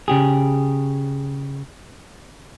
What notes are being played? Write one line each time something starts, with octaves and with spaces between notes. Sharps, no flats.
C#3 G4 G#4